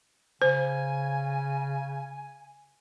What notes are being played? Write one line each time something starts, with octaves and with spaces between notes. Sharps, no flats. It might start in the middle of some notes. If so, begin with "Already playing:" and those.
C#3 C5 G#5